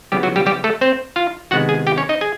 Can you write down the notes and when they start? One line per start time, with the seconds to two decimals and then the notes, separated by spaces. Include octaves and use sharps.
0.12 C#3 F#3 G3 B3 G4
0.23 F#3 F#4
0.36 G3 G4
0.46 G3 G4
0.64 A3 A4
0.81 C4 C5
1.16 F4 F5
1.51 C3 D#3 G#3 B3 F#4 F#5
1.69 G#4 G#5
1.87 G4 G5
1.98 C#4 C#5
2.09 D#4 D#5
2.21 G#4 G#5